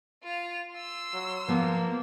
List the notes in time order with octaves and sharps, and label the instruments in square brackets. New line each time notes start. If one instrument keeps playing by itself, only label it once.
[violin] F4 F7
C6 E6
[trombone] F#3
[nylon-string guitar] F3 B3 [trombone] A#3